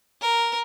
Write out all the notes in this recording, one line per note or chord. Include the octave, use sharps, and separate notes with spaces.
A#4